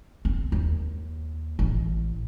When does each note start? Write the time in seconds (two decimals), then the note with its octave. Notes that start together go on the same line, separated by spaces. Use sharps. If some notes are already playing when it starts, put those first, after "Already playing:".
0.25 C4
0.52 D#2
1.59 A1